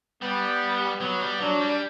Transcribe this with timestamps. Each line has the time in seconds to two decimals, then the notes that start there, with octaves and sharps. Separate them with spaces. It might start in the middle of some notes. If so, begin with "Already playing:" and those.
0.22 G3 B3
1.01 F#3 B3
1.21 G3
1.40 F#3 D4
1.60 G3